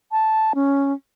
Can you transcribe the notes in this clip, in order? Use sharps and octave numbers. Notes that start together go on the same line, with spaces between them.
A5
C#4